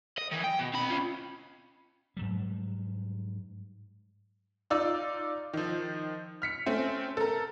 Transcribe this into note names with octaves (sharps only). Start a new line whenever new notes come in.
D#5
D#3 E3
G5
B2
C4 B5
C#4 F4
G#2 F#3 G3
D#4 F4 D5 E6
D#3 F3
F6 B6 C#7
A3 C4 C#4
A4 A#4